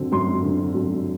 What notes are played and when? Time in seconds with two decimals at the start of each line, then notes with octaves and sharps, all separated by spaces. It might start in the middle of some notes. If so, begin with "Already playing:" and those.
Already playing: F#2 D3 F#3 C4
0.12 F#2 C6
0.43 D3 F#3 C4
0.74 F#2